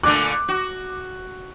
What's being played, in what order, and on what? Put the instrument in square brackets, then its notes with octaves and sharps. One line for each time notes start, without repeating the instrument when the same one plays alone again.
[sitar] A#2 D3 A3 [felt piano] D6 F#6
[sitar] F#4